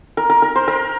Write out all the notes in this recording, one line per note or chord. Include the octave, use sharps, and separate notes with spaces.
A#4
A#4
A#4
C5
A#4